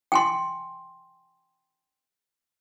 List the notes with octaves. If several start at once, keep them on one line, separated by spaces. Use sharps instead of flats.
G5 G#5 C6